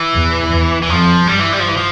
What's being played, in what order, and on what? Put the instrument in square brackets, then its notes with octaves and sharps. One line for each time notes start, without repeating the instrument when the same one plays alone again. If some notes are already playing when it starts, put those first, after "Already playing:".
Already playing: [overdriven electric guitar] E3
[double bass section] E2
E2
[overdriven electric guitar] E3
[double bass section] F2 [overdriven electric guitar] F3
[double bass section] G2 [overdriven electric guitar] G3
[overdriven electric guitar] E3
G3
F3
E3
F3